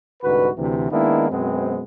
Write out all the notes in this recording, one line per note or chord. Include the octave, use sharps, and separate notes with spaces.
C2 G#2 D3 F#4 B4
D2 C3 E3
D#3 G#3 A#3 B3 D4 E4
F#2 B2 G#3 B3 C4